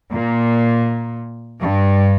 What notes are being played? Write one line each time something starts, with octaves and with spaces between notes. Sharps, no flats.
A#2
G2